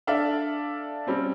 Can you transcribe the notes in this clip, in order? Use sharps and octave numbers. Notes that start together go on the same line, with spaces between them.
D4 A4 D5 E5 F5
G3 C4 C#4